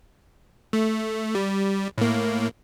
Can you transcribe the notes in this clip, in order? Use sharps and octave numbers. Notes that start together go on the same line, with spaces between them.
A3
G3
A2 A#3